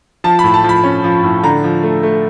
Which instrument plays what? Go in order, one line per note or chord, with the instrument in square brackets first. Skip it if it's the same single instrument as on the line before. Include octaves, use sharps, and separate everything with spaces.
[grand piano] F3 A5
A2 B5
A5
F3
B5
C#4
F3
A2
D3 A#5
F3
A3
A3